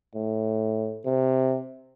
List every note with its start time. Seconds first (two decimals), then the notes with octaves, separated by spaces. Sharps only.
0.15 A2
1.05 C3